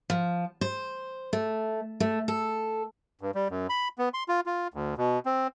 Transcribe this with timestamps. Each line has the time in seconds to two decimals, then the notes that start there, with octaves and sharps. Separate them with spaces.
0.10 F3
0.61 C5
1.33 A3
2.00 A3
2.28 A4
3.21 G2
3.35 G3
3.50 F#2
3.69 B5
3.98 B3
4.14 C6
4.28 F4
4.46 F4
4.74 D2
4.97 B2
5.26 C4